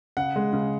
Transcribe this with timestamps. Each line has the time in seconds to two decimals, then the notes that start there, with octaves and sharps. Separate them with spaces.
0.17 C#3 F#5
0.36 G#3
0.53 C#3